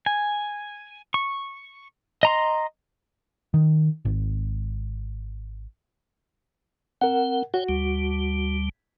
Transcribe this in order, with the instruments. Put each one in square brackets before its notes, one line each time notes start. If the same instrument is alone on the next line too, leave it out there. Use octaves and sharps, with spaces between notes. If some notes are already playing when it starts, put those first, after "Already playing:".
[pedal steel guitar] G#5
C#6
D#5 A#5 C6
[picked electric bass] D#3
G#1
[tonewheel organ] C4 [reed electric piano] A#4 F#5
[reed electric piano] F#4 [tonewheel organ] C#5 G5
[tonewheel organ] D2 G3